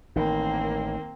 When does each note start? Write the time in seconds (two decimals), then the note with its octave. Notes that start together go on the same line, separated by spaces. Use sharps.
0.16 A1 D#3 A#3 C4